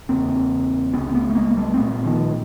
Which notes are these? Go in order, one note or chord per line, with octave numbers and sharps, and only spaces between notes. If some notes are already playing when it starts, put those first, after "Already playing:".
E2 C#3 A#3 C4
C#2 C3 B3 C#4
C4
A3 B3
A3
G#3 A#3
G3 A3
C4
C2 A#2 A3 B3
D#3 F3